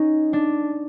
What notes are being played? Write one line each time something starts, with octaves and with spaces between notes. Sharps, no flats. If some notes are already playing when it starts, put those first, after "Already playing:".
Already playing: C#4 D#4
D4